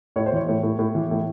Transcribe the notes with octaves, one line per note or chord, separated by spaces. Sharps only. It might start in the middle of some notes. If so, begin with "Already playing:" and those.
A2 C#5
C5
E3 C#5
A2
A2
A2
E3
A2